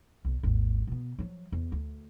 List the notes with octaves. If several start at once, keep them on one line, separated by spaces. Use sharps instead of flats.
B1 D3
G#1 D#2
B2 B3
F3 F#3
E2
D2